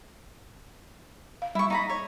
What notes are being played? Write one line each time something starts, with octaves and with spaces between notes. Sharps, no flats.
F5
G3 E4 C#6
D#4 A#5 B5
C#5